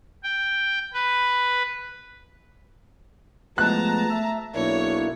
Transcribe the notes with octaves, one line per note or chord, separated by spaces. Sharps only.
G5
B4
F3 G#3 A3 B3 A5 A#5 F#6
E5
B1 A#3 D4 E4 C#5